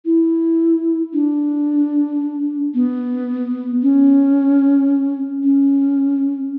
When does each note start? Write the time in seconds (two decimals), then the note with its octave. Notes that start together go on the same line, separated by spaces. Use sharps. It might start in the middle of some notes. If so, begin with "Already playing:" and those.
0.06 E4
1.14 D4
2.75 B3
3.82 C#4
5.43 C#4